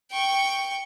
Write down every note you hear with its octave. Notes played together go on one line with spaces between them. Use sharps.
G5 C#6